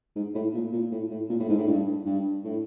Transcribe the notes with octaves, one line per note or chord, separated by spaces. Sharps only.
G#2
A2
A#2
A#2
A2
A2
A#2
A2
G#2
A2
G2
G2
A2